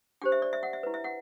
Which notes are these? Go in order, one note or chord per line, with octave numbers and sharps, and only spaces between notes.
D4 G4 C5 G5
E5
D5
E5
F#5
E5
E4 B4
E5
F#5